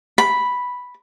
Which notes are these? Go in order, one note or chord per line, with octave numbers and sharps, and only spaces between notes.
B5